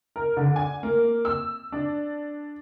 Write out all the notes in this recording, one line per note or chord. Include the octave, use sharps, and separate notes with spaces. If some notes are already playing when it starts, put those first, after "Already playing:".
A#4
D3
G#5
A#3
E6
D4